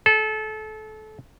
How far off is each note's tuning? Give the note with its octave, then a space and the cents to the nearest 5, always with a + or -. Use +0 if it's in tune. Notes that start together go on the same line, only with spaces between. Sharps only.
A4 -25